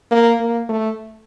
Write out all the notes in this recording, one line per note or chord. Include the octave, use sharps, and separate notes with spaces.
A#3
A#3
A3